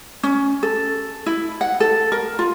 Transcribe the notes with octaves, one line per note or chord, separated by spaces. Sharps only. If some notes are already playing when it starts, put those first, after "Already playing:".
C#4
A4
E4
F#5
A4
A#4
F4